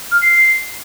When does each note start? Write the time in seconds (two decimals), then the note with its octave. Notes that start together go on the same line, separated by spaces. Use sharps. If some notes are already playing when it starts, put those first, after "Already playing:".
0.12 F6
0.22 C7
0.32 C7